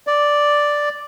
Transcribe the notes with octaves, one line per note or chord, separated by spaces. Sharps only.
D5